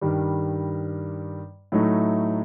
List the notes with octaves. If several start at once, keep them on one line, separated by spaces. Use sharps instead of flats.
G2 D#3 G3
A2 F#3 A3 D#4